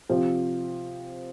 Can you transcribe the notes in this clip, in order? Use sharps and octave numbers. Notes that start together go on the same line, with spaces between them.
C3 F3 C4 G4 C5